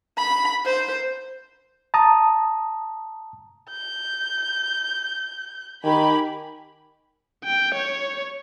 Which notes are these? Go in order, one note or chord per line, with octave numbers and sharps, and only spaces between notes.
B5
C5
A5 A#5 D#6
G6
D#3 G4 G#5 B5
G5
C#5